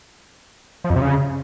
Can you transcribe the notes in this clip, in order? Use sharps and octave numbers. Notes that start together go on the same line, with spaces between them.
F3
F2
C3
C#3